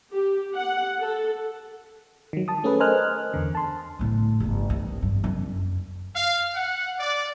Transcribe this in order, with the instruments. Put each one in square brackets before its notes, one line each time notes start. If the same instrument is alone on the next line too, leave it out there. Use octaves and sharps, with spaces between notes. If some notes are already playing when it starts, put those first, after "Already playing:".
[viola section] G4
F#5
A4
[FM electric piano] D#3 F#3
A5 D#6
A3 C#4 G#4 A4 B4
A#4 C5 D#5 G#5 F6 F#6
E2 D3
A5 C6
[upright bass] A2 D3
D1 G1
D#3 C4
G2
F#2
[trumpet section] F5
F#5
D5